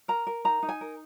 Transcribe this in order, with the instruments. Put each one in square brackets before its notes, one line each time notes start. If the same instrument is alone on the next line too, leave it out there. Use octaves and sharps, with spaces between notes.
[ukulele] A#4 A#5
A#4
D#4 A#5
D#4
G#5
A#4